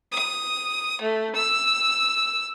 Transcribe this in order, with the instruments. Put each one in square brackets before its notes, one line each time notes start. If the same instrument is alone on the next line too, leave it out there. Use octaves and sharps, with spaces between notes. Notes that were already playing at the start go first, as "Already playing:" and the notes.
[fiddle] D#6
A3
E6